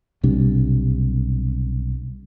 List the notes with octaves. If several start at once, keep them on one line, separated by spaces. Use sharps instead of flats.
B1 C3 G3 D4